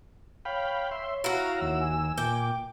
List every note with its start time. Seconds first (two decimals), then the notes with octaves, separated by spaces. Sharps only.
0.45 C#5 F5 G5 B5
0.91 E5 C6
1.24 E4 F#4 F5 A#5
1.61 D#2 E6
1.80 G#5
2.18 A#2 G5 D6